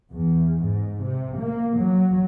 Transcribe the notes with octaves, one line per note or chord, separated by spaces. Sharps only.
E2
G#2
C3
A#3
F#3